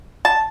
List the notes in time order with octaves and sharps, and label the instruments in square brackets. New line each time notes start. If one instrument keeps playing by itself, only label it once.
[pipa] A5